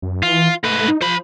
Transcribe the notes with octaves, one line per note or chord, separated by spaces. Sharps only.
F#2
E3 F4
G#2 A3 B4
D#4
F3 C5 B5